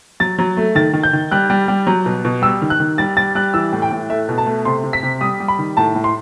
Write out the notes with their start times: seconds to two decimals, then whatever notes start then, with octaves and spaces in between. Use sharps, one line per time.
0.20 F#3 A6
0.38 F#3
0.57 A3
0.75 D#3 A6
0.93 D#3
1.03 G6
1.13 D#3
1.31 G3 F#6
1.50 G3
1.68 G3
1.87 F#3
2.06 B2
2.25 B2
2.42 G3 E6
2.62 D#3
2.70 F#6
2.80 D#3
2.98 G3 A6
3.17 G3 A6
3.35 G3 F#6
3.54 E3 E6
3.72 A2
3.82 G5
3.91 A2
4.09 A3 E5
4.29 B2
4.38 A5
4.46 A3
4.65 C3 C6
4.84 C3
4.93 B6
5.03 C3
5.21 G3 D#6
5.40 G3
5.48 B5
5.59 D#3
5.77 A2 A5
5.95 A2
6.04 C6